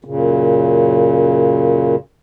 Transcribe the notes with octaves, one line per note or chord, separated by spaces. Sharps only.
F#2 A#2 C#3